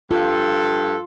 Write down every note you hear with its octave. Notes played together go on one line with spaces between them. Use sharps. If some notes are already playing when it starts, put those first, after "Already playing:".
G2 F4 A4